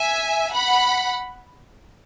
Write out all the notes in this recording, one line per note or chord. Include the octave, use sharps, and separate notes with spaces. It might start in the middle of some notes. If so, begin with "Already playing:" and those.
Already playing: E5 G#5
F#5 B5